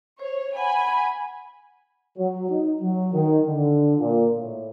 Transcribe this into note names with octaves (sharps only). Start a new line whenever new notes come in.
C5 C#5
F#5 G#5 B5
F#3
D#4
F#3
D#3
D3
A#2
A2